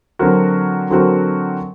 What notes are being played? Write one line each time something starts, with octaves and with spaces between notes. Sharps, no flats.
D3 F#3 C4 F#4 A#4
D3 F#3 C4 F#4 A#4